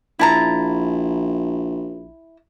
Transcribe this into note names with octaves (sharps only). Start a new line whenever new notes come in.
A#1 E4 A5 A#5